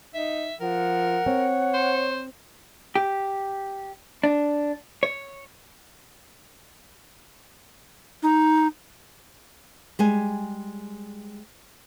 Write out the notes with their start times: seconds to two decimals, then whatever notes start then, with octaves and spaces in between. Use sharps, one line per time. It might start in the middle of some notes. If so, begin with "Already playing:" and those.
0.14 D#4 E5
0.60 F3 A#4 F#5
1.26 C4 C#5
1.74 C5
2.95 G4
4.24 D4
5.03 C#5
8.23 D#4
9.99 G3 G#3 G#5